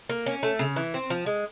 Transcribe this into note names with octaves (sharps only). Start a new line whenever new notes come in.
A#3
C#4
A3
C#3
E3
C4
F3
G#3